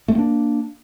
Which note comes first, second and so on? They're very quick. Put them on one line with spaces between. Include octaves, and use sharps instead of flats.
A3 C4 A#3 D4